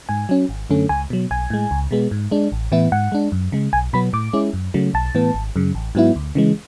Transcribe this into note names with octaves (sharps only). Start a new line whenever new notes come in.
G#2 G#5
F#3 C#4
G#1
F#2 D3 A3 C#4
C#2 G#5
B2 F#3
B1 G#5
A2 G#3
C#2
B2 G#3 B3
G#2
G#3 D4
A1
A2 E3 B3 E4
G#2 F#5
G#3 D4
F#2
C#3 G#3
B1 G#5
B2 F#3 B3 B5
A2 D6
G#3 C#4 E4
F#2
C#3 F#3 A3
B1 A5
A2 E3 B3
G#1
F#2 C#3
A1
G#2 F#3 B3 E4
D2
C#3 E3 G#3